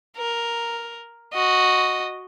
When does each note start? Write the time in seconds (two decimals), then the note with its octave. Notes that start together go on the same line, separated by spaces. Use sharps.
0.17 A#4
1.33 F#4 D#5